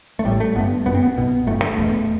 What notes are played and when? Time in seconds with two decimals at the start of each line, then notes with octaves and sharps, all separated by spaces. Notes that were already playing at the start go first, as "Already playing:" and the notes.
0.19 A3
0.25 A1 A2 G3
0.40 A3
0.55 G1 G2 B3
0.86 G1 F#2 B3
0.95 C4
1.03 B3
1.17 B1 B2
1.47 G1 G2 A3
1.62 A3
1.77 E1 E2 B2